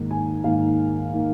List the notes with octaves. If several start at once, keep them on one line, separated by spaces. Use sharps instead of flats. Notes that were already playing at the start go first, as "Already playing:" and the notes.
Already playing: G#2 D#3 A#3
G#5
G#2 D#3 A#3 F5
D#3 A#3